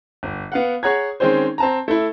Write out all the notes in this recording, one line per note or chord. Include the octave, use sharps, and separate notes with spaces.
G1
B3 F5 F#5
G#4 C#5 F#5 A#5 G#6
D#3 G#3 C4 C#4 C5
C4 A5 A#5
A3 E4